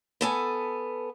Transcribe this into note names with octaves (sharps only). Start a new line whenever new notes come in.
B3 A4 G#5